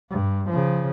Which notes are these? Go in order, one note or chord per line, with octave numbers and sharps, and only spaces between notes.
G2
C#3 F3